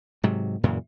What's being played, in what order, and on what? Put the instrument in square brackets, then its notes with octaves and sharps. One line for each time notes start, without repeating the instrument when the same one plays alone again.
[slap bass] G#2 C3 F#3
F#2 A#2 C#3 E3